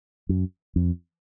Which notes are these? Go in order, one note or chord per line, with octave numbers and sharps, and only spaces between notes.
F#2
F2